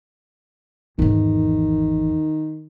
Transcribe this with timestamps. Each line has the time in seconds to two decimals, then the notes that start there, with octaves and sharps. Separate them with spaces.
0.99 G#1 E2 D#3